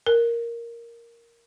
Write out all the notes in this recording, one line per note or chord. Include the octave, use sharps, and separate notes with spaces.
A#4